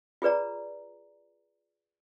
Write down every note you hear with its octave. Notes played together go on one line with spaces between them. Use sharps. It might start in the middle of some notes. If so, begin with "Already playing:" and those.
F4 G#4 B4 D5 A#5